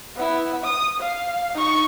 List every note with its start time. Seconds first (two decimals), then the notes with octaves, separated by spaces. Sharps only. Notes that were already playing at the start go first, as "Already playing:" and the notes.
0.16 B3 E4
0.65 D#6
1.00 F5
1.55 D#4 C#6